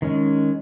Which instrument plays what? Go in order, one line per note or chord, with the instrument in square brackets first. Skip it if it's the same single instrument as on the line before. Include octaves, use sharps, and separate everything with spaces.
[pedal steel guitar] D#3 G#3 C#4